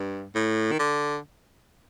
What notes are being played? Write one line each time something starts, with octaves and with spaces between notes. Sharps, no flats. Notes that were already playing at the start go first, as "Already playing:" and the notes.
Already playing: G2
A2
D#3
D3